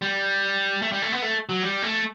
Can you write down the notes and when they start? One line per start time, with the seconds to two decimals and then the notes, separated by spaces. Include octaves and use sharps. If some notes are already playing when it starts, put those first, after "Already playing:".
0.02 G3
0.82 A3
0.92 G3
1.02 A3
1.12 B3
1.22 A3
1.49 F#3
1.63 G3
1.82 A3